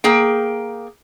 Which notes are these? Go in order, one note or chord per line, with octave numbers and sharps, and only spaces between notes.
A#3 G#4 G5